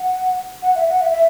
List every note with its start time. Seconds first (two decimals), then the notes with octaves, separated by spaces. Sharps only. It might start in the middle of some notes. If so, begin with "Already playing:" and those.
Already playing: F#5
0.62 F#5
0.75 E5
0.89 F#5
1.01 E5
1.13 E5